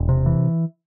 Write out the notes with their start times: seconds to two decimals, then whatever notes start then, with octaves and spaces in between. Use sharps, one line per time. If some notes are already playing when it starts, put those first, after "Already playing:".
Already playing: E1
0.09 C3
0.26 E3